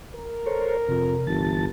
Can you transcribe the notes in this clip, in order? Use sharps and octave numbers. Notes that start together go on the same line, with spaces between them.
A#4
A4 C5 C#5
F2 C3
G1 E3 A5 A6